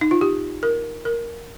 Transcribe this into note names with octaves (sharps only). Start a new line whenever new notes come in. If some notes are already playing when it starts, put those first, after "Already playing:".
D#4
F4
G4
A#4
A#4